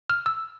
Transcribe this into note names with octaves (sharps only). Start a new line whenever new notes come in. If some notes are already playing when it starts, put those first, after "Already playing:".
F6
E6